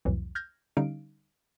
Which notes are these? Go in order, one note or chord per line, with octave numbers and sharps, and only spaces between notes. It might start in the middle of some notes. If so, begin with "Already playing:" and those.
C2 F2 A2 E3 F#3
F6 G6 G#6 A#6
D3 G3 C#4 D#4 F5 D7